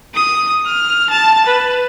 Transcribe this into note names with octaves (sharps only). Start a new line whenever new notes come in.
D#6
F6
A5
B4